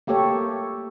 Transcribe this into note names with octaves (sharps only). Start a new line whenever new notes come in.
A3 A#3 G4 A4 C#5